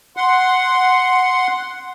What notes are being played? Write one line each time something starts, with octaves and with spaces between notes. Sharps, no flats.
F#5 C6